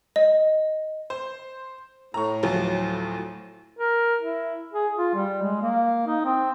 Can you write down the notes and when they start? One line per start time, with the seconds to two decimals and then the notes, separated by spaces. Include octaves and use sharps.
0.16 D#5
1.10 C5
2.14 A2 A#5 C#6
2.43 D2 F3 F#3
3.79 A#4
4.21 E4
4.74 G#4
4.96 F4
5.14 G3
5.42 G#3
5.62 A#3
6.07 D#4
6.25 C4